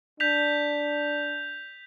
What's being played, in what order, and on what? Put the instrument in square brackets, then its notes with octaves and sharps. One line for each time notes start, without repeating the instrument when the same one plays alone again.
[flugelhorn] D4 [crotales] G6 B6 F7